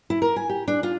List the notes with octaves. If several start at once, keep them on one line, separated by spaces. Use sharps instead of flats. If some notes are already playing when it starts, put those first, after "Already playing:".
E4
A#4
G#5
G4
D4
F4